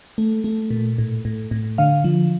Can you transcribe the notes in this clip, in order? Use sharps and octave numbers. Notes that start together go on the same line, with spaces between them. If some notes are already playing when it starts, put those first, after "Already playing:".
A3
A3
A#2
A2
A2
A2
D3 F5
F3